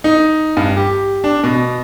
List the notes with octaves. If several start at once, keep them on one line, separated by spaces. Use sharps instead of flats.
D#4
G2
G4
D4
B2